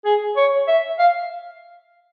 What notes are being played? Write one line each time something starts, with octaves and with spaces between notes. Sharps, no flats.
G#4
C#5
E5
F5